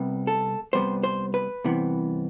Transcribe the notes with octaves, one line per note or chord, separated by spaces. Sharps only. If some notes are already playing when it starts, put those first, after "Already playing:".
Already playing: C2 C3 G3 B3
A4
C2 C3 G3 B3 C5
C5
B4
C2 C3 E3 B3